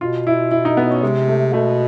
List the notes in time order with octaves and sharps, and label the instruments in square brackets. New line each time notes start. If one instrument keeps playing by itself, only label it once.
[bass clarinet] B2 [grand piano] F4
[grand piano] E4
E4
D#4
B3
C#4
[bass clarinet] C3 [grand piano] G#3
[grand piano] A3
[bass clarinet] B2 [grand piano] A3